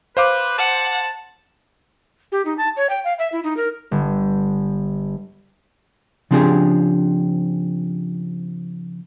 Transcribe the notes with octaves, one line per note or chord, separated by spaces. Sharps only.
B4 C5 F5 D6
F#5 A5
G4
D#4
A5
C#5
G5
F5
E5
E4
D#4
A#4
G1
C#3 F3 C4 D4 G4 G#4